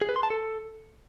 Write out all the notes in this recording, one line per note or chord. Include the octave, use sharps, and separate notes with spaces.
G#4
B4
C6
A5
A4